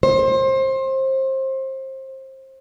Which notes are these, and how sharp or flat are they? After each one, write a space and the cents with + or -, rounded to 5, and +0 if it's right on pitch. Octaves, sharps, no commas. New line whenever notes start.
C5 +25